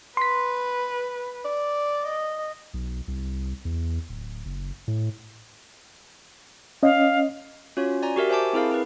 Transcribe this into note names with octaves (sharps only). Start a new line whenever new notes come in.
B4 C6 B6
D5
D#5
B1
C2
E2
D1
F#1
A2
C#4 D#5 F5
C#4 F4 F#4 C#5
D5 G#5 A#5
F#4 G4 A#4 E5
C5 E5 G#5 A5 D6
C4 E4 G#4 A#4 F5
C4 E4 A#4 B4